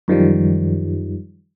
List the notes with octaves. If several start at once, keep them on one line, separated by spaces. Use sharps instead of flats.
F#2 D#3 F3 G3